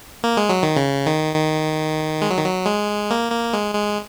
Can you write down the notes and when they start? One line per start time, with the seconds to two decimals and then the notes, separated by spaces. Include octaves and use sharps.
0.24 A#3
0.37 G#3
0.49 F#3
0.63 D#3
0.76 C#3
1.06 D#3
1.35 D#3
2.22 G#3
2.30 F#3
2.37 D#3
2.45 F#3
2.66 G#3
3.10 A#3
3.31 A#3
3.53 G#3
3.75 G#3